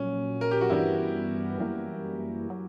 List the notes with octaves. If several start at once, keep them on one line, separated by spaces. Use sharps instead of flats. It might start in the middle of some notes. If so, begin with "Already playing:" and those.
Already playing: A#1 A#2 F#3 C#4
A#4
G4
F#4
G2 E3 G3 B3 E4
F#2 E3 G3 A#3
F#3